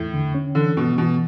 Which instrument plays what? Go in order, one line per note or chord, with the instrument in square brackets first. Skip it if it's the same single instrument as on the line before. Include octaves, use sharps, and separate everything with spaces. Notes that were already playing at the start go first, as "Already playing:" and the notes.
Already playing: [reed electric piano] E2 [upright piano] A2
[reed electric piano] D3
C#4
[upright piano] D3 [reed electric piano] E3
[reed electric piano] G2 [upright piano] B2
[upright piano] B2 [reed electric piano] E3